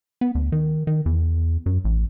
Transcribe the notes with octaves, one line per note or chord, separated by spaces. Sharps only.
B3
D2
D#3
D#3
E2
F#2
A1